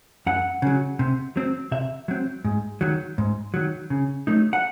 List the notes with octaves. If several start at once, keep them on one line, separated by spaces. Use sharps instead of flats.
F#2 F#5
C#3 F#3
C3
F#3 C4
C3 E5
F#3 C4
G#2
D#3 F#3
G#2
D#3 F#3
C#3
F#3 A3 D#4
F#5